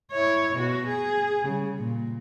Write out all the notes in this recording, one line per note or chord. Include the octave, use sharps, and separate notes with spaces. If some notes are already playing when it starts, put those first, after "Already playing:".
E4 C#5
B2 F#4
G#4
C#3 G3
A#2